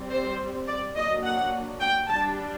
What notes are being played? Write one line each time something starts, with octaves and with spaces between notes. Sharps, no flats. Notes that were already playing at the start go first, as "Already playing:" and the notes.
Already playing: G3 C4
C5
D5
F#3 A#3 D4 D#5
F#5
G5
G3 D4 A5